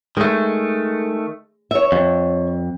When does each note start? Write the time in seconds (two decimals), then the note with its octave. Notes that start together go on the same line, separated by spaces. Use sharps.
0.17 D#3 G#3 A3
1.71 C#5 E5
1.92 F2